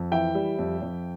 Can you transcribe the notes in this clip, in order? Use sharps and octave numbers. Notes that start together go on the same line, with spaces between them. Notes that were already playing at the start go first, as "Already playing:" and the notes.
Already playing: F2
E3 E5 G5
G3
F2
F2